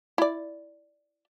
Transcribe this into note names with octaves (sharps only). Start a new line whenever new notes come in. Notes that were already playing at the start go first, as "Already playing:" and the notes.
E4 D5